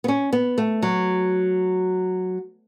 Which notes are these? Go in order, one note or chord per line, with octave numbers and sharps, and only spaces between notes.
B3
C#4
B3
A3
F#3